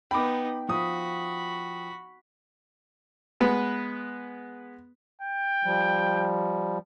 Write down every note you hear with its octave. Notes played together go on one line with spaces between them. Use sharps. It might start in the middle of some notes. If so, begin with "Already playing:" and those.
B3 D#4 G5 B5 D6
F3 F#4 B5 D#6
G#3 B3 B4 B5
G5
F3 G3